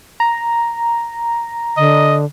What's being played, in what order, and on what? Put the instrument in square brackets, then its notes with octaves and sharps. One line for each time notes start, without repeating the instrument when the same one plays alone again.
[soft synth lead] A#5
[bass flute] D3 [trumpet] D#5